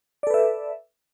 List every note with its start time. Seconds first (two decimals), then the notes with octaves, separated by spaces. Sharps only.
0.23 D5
0.27 A4
0.30 B4
0.34 E5